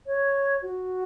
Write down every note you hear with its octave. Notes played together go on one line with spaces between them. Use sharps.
C#5
F#4